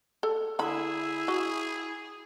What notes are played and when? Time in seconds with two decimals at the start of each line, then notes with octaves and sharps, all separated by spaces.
0.23 A4
0.59 D3 E4 G#4 B5
1.28 F#4